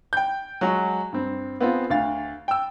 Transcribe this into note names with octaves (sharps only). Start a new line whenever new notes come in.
G5 G6
F#3 G#3 F#4
G2 C4
B3 C4 F4 G#4
D2 F5 A6
G5 E6